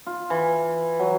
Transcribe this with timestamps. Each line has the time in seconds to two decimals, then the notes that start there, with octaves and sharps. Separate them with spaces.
0.07 F4
0.30 E3
0.99 F#3